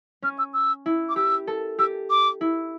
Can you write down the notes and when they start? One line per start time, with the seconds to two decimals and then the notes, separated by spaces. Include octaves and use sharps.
0.22 C#4 F6
0.38 E6
0.53 E6
0.86 E4
1.09 D6
1.16 G4 E6
1.47 A4
1.79 G4 E6
2.10 D6
2.41 E4